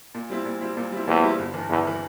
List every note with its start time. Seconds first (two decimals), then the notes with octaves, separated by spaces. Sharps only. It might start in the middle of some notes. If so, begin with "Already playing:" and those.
0.14 A#2
0.30 G3 C4 E4
0.45 A#2
0.61 G3 C4 E4
0.77 A#2
0.92 G3 C4 E4
1.07 E2 A#2
1.23 G3 C4 E4
1.39 G1
1.54 G2 E3
1.70 G1 E2
1.87 E3